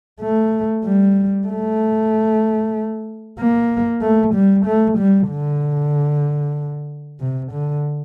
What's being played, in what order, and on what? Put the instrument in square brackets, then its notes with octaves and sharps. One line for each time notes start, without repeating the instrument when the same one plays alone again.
[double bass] A3
G3
A3
A#3
A3
G3
A3
G3
D3
C3
D3